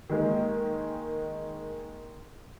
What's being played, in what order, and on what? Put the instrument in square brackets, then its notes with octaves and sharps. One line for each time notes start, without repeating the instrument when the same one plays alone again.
[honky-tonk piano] D#3 G#3 A#3